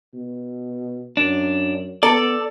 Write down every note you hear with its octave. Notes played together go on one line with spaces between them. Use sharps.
B2
F#2 D4
B3 A4 D5